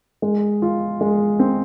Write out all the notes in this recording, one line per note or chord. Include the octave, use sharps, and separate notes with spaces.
G#3
F4
G#3
C4